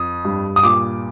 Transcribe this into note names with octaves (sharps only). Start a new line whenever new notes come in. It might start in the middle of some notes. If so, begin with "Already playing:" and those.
Already playing: F2 D#6
G2
D#6
A#2 D6